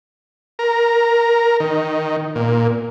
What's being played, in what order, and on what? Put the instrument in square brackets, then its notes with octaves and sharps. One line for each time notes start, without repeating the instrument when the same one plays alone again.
[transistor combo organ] A#4
D#3
A#2